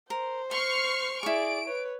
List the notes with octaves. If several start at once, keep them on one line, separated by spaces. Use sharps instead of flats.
A#4 C5
C6 C#6 F6 C7
E4 G#4 D5 C#6 D7
B4 C#5